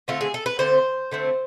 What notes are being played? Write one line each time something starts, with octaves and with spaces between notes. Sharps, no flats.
D3 A3 C4 F4
G#4
A4
B4
D3 A3 C4 C5
D3 A3 C4